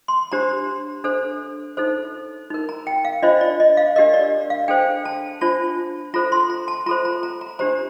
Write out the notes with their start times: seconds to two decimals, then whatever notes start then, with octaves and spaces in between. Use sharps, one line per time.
0.08 C6
0.32 D4 G4 C5 A#5
1.04 D4 A4 C5
1.77 D#4 A4 C5
2.50 D#4 A#4
2.69 A#5
2.87 G5
3.05 F5
3.22 D4 F4 C5 D#5
3.41 D5
3.60 D#5
3.77 F5
3.96 D4 G4 A#4 D#5
4.14 D5
4.50 F5
4.68 D4 A4 C5 G5
5.05 A5
5.41 D4 F4 C5 A5
6.14 F4 A4 C5 A#5
6.32 C6
6.50 A#5
6.68 A5
6.86 F4 A4 C5 A#5
7.05 A#5
7.23 A#5
7.41 A#5
7.59 D4 G4 C5 A#5